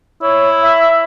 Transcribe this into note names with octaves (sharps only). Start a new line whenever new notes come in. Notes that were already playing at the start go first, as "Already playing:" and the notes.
E4 C#5
E5